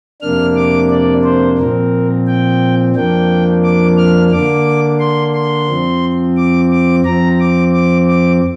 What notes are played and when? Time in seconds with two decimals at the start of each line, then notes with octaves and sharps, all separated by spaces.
0.21 F2 C3 A#3 D4 F6
0.56 D6
0.90 D5
1.24 C5
1.58 A#2 F3 C4 A#4
2.27 G5
2.95 F2 F3 A#3 D4 G5
3.63 D6
3.97 F6
4.31 D3 A#3 D4 D6
4.99 C6
5.33 C6
5.68 F2 F3 C4
6.36 D6
6.71 D6
7.04 F2 F3 C4 A#5
7.39 D6
7.73 D6
8.08 D6